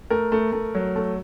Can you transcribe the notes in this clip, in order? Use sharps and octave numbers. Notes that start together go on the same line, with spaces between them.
A3 A#4
A3
A3
F#3
A3